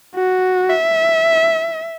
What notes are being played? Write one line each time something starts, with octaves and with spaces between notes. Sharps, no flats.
F#4
E5